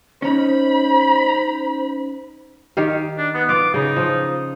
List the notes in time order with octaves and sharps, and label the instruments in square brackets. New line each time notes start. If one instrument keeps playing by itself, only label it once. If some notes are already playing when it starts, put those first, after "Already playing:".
[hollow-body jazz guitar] C#4 D#4 [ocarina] C5 [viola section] B5
[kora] D#3 G4 F5
[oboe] D4
B3
[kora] B3 F4 [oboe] D6
[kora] C#3 [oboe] D#4
[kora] F3 F4